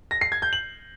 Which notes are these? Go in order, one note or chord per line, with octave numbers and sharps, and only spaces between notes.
A#6
C7
G#6
G6
F#7